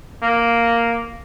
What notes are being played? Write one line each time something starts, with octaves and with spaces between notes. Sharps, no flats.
A#3